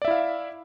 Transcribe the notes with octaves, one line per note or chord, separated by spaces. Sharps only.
E4 D5 E5 F5